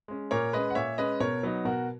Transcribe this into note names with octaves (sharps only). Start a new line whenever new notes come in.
G#3 C#4
A#2 A#4 C#5
G#3 C#4 B4 D#5
F#5
A#2 C#5 E5
G#3 C#4 B4 D#5
B2 A#4 C#5
F#3 B3 D#4
B2 F#4 A#4